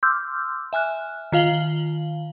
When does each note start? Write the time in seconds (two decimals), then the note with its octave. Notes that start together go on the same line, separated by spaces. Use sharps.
0.03 C6 D6 E6 F6 G6
0.73 E5 G#5 F6 F#6
1.32 D#3 F4 F5 F#7 G7